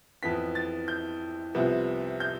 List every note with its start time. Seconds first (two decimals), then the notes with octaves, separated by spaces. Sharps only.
0.23 F2 E3 B3 B6
0.55 A6
0.88 G6
1.54 C2 C3 F3 B3
2.20 G6